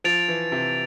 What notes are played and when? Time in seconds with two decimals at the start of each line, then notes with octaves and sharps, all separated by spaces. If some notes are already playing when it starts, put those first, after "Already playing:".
0.04 F3 A6 D7 F7
0.28 E3
0.52 C3